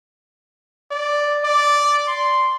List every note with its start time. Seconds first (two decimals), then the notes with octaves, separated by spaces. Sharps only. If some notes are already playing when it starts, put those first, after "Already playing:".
0.91 D5
1.44 D5
2.08 C6